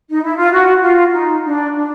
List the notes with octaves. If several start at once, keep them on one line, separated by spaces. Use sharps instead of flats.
D#4
E4
F4
F#4
F4
D#4
D4
D4